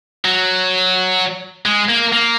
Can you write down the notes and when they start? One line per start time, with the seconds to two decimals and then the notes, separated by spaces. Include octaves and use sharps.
0.25 F#3
1.65 G#3
1.89 A#3
2.12 A#3